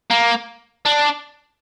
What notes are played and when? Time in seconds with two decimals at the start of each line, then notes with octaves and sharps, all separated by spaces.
0.11 A#3
0.86 D4